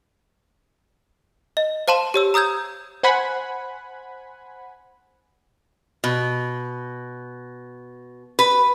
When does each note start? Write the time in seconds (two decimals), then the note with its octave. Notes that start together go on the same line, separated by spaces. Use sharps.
1.57 D#5
1.88 C5 F5 A5 C6 E7
2.14 G4 C#5 E6
2.34 A#5 D#6 E6 G6 G#6
3.03 C5 F#5 G#5 B5
6.04 B2
8.39 B4